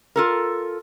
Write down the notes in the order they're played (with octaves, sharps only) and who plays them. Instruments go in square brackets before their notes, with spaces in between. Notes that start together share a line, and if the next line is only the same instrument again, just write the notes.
[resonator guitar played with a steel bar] F4 A4 A#4